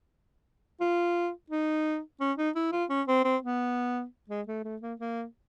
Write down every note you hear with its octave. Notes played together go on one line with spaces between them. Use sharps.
F4
D#4
C#4
D#4
E4
F4
C#4
C4
C4
B3
G#3
A3
A3
A#3
A#3